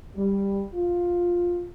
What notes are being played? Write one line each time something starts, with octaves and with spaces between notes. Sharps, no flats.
G3
F4